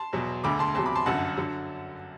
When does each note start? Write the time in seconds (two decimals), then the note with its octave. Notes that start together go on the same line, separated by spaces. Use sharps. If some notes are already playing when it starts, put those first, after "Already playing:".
Already playing: A5 C6
0.13 E2 B2 F#3
0.44 E1 D2 D3 B5 D6
0.59 A5 C6
0.75 E2 C3 F#3 A5 C6
0.86 B5 D6
0.96 A5 C6
1.06 G1 F#2 D3 F#3 F#5 A5
1.37 D3 F#3